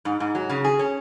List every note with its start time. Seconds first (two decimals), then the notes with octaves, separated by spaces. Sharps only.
0.05 G#2
0.20 G#2
0.35 F#3
0.49 C#3
0.64 G#4
0.79 C#4